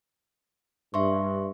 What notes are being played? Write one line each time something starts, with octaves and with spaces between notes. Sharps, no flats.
G2 E5 C6 C#6